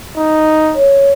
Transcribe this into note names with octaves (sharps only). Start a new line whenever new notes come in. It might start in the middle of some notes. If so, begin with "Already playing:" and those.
D#4
C#5